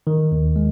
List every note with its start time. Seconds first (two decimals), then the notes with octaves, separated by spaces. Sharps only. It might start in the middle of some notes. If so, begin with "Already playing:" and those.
0.07 D#3
0.32 D#2
0.56 G#3